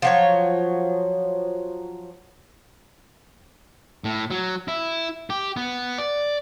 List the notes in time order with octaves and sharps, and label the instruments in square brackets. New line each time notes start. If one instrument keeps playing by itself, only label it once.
[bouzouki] F3 F#3 C#5
[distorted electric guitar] A2
F#3
E4
G4
B3
D5